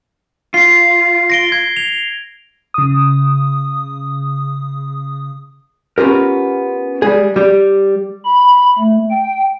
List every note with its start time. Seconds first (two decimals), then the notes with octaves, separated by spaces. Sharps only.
0.54 F4 C7
1.30 A#6 D7 G7
1.52 G#6
1.77 F7
2.74 C#3 D#6
5.98 B3 C#4 F4 G4 A#4
7.02 G3 G#3 G#4
7.36 G3 G4
8.25 B5
8.79 A3
9.11 G5